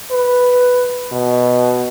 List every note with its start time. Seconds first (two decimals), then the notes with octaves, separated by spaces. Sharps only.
0.11 B4
1.12 B2